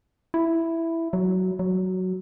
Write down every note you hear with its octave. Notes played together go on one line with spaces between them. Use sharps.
E4
F#3
F#3